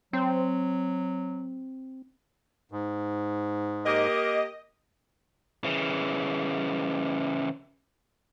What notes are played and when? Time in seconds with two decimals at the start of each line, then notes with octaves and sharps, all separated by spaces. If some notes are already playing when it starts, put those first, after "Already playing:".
0.13 F#3 C4
2.72 G#2
3.85 A#3 G4 A#4 D#5
5.64 C#3 E3